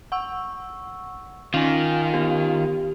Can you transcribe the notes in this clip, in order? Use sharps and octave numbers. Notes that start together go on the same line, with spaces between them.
F#5 C#6 E6
D#3 C#4 F4 G#5
B3 G4